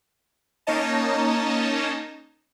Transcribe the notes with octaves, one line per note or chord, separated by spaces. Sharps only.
A#3 C#4 D#4 C#5 D#5 A5